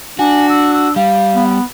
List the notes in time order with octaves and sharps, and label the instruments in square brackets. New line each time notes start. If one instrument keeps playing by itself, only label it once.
[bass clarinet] D4 [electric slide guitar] F#4 [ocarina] G#5
[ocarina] E6
E6
[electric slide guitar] G3 [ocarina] F5
[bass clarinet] B3